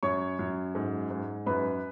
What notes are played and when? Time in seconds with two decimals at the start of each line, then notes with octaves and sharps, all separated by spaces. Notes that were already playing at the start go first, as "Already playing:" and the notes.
0.03 F#2 C#5 C#6
0.39 F#2
0.75 G#2
1.11 G#2
1.46 F#2 B4 B5